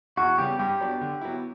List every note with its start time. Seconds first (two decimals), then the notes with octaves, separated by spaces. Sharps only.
0.17 E2 F#4
0.38 C#3 G3 B3 G4
0.59 G2 G4
0.80 F#3 B3 D4
1.01 D3
1.21 F#3 B3 E4